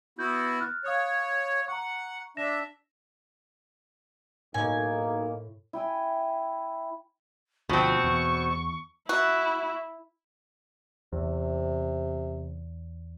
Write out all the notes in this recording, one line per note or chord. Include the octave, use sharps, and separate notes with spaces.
B3 E4 F#4 G6
F6 F#6 A6
C#5 F5 D#6 F#6
F#5 A#5 C#6
D4 E5 A#6 E7
B1 A2 A#3 D#4 G#5
E4 G5 G#5
D2 B2 F3 C4 C#6
E2
E4 F#4
E2 C3